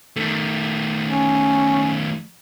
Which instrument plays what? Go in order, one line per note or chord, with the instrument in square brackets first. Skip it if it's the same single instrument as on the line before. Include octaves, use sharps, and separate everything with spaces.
[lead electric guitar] D#3 A3
[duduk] C#4